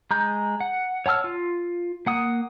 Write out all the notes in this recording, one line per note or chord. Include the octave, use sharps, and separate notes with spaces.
G#3 A#5 G6
F#5
C#5 F#5 A5 E6 F6
F4
A#3 F#5 D#6